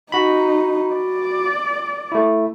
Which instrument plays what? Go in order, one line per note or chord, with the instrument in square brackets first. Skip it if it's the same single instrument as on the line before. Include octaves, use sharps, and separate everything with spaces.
[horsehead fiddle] D#4 [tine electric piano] F#4 B5
[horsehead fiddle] D5
[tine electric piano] A3 E4